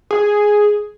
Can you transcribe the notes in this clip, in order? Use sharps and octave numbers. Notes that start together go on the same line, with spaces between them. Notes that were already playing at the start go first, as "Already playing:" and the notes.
G#4